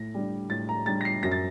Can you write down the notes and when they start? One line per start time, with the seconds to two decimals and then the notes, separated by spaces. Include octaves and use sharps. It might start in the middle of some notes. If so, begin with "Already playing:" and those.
Already playing: A2 A#6
0.14 G3 D4
0.50 A2 A6
0.69 A#5
0.86 G3 D4 A6
1.01 A#6
1.05 C7
1.23 F#2 A#6
1.32 A6